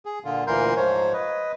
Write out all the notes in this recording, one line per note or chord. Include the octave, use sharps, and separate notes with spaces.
G#4
A#2 D3 F4
D2 A#2 E3 A#4 C6 G6
G#2 F3 C5 C#5
B4 D#5